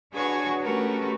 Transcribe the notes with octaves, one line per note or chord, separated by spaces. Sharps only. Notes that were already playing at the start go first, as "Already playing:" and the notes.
D4 F#4 G#4 B4 C#5
A3 C#4 F#4 G4 A#4 B4